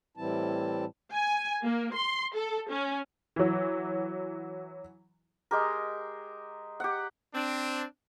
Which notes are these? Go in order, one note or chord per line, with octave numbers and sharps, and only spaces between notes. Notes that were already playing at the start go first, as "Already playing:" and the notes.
A2 E3 G3 C4 E4 A5
G#5
A#3
C6
A4
C#4
E3 F#3
G#3 G4 A#4
G4 F#5
C4 D4